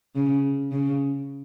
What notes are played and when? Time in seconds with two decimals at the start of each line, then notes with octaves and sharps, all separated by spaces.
0.16 C#3
0.72 C#3